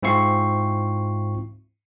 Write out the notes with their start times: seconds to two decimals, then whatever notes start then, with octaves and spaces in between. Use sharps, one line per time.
0.03 G#2 C4 E4 F4 C#6 C7